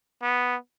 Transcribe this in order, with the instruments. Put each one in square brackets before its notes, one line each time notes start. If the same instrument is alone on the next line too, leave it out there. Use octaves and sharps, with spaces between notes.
[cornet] B3